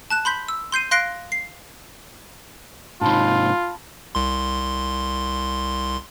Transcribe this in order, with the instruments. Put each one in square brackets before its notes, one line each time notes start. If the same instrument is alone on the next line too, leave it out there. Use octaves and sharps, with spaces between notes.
[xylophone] A5 F#6 E7
B5 C6 G6 B6
E6
C6 G6 C7 D#7
F5 C6 F#6 A#6 C7 D7
C7
[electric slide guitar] G#2 C3 D#4 [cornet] F4 [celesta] A5 B5 C6
[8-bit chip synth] C2 C6